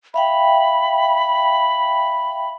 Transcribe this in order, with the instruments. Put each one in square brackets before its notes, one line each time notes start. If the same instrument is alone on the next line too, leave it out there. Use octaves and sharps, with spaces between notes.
[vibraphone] E5 F5 G5 [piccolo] B5